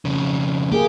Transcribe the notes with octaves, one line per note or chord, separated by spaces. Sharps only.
F2 C#3
A#3 G4 G#4